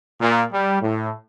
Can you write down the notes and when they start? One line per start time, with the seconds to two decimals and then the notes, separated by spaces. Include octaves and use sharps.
0.21 A#2
0.52 G3
0.82 A2